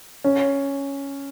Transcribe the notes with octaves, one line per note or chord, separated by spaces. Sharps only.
C#4